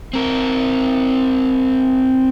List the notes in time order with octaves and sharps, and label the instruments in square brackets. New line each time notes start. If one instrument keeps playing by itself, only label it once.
[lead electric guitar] C4 A#4